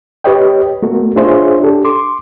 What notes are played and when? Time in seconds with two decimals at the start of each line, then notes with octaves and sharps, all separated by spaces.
0.24 G4 B4 C#5 D#5 G5
0.82 A3 B3 F#4 A#4
1.16 D4 F4 G#4 C5 C#5 E5
1.60 D4 G4 A4
1.85 C6 D6